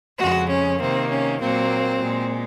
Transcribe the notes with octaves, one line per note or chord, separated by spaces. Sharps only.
F2 C#3 G#3 F#4
C#4
C3 D#3 A#3 C4
C#4
A#2 F#3 A#3 C4
A#2 G#3